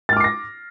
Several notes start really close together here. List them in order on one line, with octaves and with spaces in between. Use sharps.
A6 F6 D6 C7 A#6